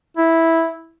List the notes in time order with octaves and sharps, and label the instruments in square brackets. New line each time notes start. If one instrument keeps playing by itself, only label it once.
[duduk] E4